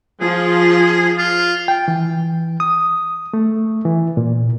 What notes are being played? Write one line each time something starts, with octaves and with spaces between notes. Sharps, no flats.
F3 F4 G#4
F4
G5
E3
D#6
A3
E3
A#2